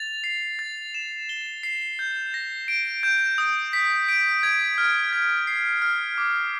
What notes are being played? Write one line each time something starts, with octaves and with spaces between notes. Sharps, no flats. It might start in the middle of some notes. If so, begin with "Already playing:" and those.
Already playing: A6 F7
C7
A6
E7
G7
C7
G6
A#6
D7
G6
D#6
B6
D7
G#6
F6
G#6
C7
F6
D6